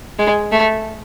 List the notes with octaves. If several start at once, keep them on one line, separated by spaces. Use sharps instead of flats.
G#3
A3